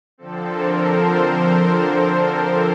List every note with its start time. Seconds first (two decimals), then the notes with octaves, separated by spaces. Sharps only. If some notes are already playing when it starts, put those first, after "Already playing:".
0.18 D3 F3 C4 A4
0.48 A#4
0.79 C5